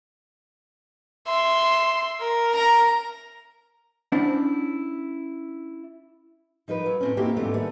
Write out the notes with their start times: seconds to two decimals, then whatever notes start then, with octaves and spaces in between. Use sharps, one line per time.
1.27 E5 C6
2.20 A#4
2.53 A#5
4.12 C#4 D4 E4 C5 F#5
6.68 F3 D#4 A#4 B4
6.86 F#3
7.01 A2 C4 C#4
7.17 A#3 C4 D#4 E4 F#4 G4
7.37 D2 G#2 E3 A3 B3 C4
7.54 D#3 G3 A3 B3